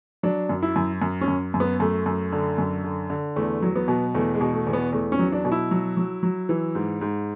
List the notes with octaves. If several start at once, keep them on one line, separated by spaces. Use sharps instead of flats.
F#3 D4
F#2
E4
F#2
F#2
C#4
F#2
F#2
B3
F#2 A3
F#2
D3
F#2
D3
D3
E2 A3
F#3
B3
B2
E2 A3
G#3
B2
A3
E2
B3
E2 A3
C#4
F#3
D4
B2
E4
F#3
F#3
F#3
E3
G#2
G#2